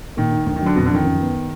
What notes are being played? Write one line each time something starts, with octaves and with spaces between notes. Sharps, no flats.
A#2 D#3
D#4
D2 D#3
D#3
F#3
D3
F2 B2
D3
D#3 F3
F#2
B3